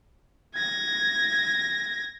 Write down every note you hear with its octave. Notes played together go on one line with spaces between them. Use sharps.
G#6 A#6